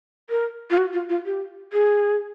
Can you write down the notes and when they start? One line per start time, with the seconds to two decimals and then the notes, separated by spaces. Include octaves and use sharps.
0.30 A#4
0.70 F4
0.78 F#4
0.93 F4
1.09 F4
1.26 G4
1.73 G#4